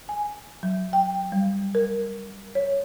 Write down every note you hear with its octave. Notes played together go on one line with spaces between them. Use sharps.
G#5
F#3
G5
G3
A#4
C#5